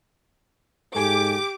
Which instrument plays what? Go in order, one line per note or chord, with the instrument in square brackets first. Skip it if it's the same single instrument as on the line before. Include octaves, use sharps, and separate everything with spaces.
[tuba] G#2 [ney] G4 [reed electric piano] A4 G#5 G#6 [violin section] D6